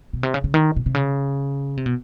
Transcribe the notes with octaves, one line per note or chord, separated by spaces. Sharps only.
B2
C3
C#3
C#3
D#3
B2
C3
C#3
C3
B2